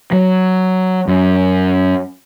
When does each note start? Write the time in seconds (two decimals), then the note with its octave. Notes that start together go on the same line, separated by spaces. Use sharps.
0.12 F#3
1.08 F#2